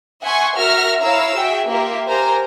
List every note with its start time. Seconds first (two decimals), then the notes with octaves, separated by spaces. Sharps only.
0.22 E5 F#5 G#5 C6 C#6
0.56 F#4 A#4 E5 F6 A#6
1.02 E4 C#5 F5 A#5 E6
1.37 F#4 G#4 E5 G5
1.67 A#3 F4 G4 A#4 E5
2.09 G4 A#4 C5 G#5 A#5